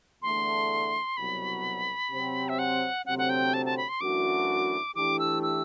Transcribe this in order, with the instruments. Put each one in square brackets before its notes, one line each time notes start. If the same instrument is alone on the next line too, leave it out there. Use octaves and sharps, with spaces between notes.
[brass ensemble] E2 D3 A3 [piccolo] C6
[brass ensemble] C2 B2 F#3 [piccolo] B5
[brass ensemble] C3 F#3 C4
[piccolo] E5
F#5
[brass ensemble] D2 C3 F#3 C4 [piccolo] F#5
[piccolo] F#5
G5
A5
A5
B5
C6
[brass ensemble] F#2 E3 A3 D4 F#4 [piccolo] D6
[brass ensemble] E3 A3 D4 G4 [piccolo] D6
[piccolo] E6
E6